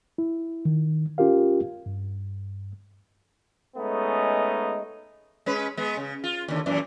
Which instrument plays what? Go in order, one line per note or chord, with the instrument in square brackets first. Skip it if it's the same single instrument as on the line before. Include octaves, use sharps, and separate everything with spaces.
[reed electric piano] E4
D#3
C#4 F4 G4 A#4 F5
G2
[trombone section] G#3 A3 B3 C#4 D#4
[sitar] G#3 C#4 B4
G#3 B3
C#3
F4
D#2 D3
F#2 A#2 E3